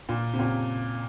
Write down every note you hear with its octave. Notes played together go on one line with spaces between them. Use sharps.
A#2
C3
A#2 C#3